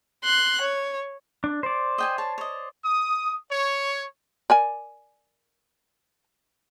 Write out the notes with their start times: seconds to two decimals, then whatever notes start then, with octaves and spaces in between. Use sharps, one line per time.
0.24 C6 F#6
0.61 C#5
1.44 D4
1.63 C5 D5
1.98 D#5 G5 G#5
2.18 C#5 A5
2.38 C#5 D#5
2.85 D#6
3.50 C#5
4.50 A#4 D5 G#5